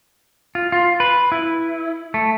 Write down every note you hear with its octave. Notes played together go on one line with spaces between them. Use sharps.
F4
F4
B4
E4
A3